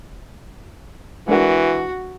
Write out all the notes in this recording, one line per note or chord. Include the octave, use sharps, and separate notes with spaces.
E3 G#3 D4 F#4 A#4